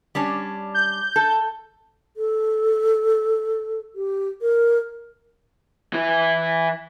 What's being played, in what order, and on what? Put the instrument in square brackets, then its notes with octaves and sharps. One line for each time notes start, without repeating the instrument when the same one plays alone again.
[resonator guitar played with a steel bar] G3 C#4 D4
[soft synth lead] G6
[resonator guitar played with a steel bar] A4
[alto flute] A4
G4
A#4
[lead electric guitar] E3 E4